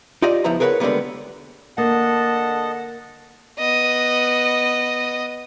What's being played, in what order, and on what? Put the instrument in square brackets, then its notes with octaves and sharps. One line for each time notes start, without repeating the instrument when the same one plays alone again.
[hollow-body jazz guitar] D#4 F4 G4 D5 D#5
C#2 F3 B3 E4 A#5
G#4 A#4 B4 C#5 F#5
D3 G3 G#3 A#3 B3
[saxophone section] D3 F#5 [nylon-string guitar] A#3 [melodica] D#5 A5
[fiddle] B3 D#5